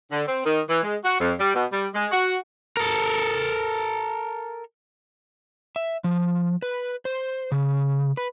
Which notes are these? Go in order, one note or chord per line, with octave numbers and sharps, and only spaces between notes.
D3
C4
D#3
E3
G#3
F#4
F2
G3
B2
G3
G#3
F#4
A4 A#4
E5
F3
B4
C5
C#3
B4